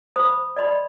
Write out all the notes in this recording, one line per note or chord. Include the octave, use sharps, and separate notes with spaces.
C5 B5 D#6
D5 D#5 B5 C6